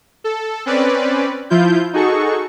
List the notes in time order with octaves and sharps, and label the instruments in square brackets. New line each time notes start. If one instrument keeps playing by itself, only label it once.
[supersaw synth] A4
C4 C#4 B4 D5
F3 E4 F4 G6
D#4 F#4 G#4 A4 C#6